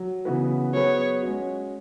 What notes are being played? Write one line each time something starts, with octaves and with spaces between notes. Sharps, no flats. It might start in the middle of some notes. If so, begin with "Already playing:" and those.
Already playing: F#3
C#3 E3 B3 F#4 B4
F#3 B3 G#4 B4 C#5
G#3 C#4 F#4